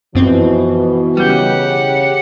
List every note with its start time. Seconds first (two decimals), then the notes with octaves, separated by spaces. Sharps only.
0.15 F#2 B2 E3 F3 C4
1.17 C#3 G3 G4 F#5 G6